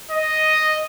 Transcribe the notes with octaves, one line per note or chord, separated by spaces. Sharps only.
D#5